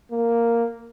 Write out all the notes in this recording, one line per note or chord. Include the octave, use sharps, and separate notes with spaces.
A#3